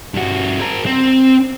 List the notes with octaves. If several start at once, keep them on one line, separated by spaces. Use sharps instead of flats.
G2 F#4
G#4 A#4
C4